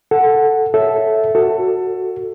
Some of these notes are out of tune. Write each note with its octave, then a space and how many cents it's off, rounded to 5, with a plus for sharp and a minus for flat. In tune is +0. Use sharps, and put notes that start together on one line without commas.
A4 +5 F#5 +0
A4 -5 C#5 -5 E5 +0
F#4 +0 A4 +20